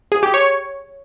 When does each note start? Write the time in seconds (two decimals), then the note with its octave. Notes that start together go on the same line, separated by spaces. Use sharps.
0.12 G#4
0.23 G4
0.34 C#5